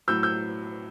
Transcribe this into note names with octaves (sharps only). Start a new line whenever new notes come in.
A2 F#3 E6 G6
E6 G6